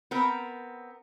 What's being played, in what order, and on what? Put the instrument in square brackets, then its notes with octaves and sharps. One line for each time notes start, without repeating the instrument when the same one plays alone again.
[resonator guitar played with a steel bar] B3 C4 A#4